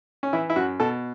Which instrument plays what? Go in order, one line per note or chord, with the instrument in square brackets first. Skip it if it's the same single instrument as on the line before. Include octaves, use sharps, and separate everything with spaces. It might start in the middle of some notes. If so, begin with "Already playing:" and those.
[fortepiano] C#4
E3 E4
E4
F#2 F#4
B2 A4